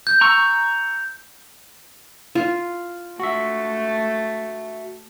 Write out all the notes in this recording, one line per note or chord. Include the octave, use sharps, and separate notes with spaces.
G6
A#5 C#6 E6
F4
A3 F#4 E5